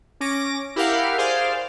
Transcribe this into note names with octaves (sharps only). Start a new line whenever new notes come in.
C#4 D6 A#6
E4 G4 A#4 F5 F#5
G#4 C5 D5 F5